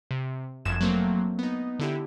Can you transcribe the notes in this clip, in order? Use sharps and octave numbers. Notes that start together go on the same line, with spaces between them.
C3
G1 F#2 F3 G#6 E7
F#3 A3 A#3 C4
B3 D#4
D3 E4 G4